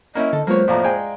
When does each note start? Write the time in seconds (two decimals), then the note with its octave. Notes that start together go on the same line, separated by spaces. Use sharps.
0.15 A#3 C#4 E4 D#5
0.33 D3 A4
0.47 F#3 G#3 A#3 B3 F4 C5 C#5
0.68 A#1 F2 A2 D5 F5 A#5
0.84 G#3 G5 G#5